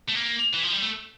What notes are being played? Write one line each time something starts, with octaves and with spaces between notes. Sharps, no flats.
A3
A#3
E3
F3
G3
A3